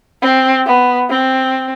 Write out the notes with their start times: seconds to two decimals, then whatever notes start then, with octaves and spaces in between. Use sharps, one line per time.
0.22 C4
0.66 B3
1.10 C4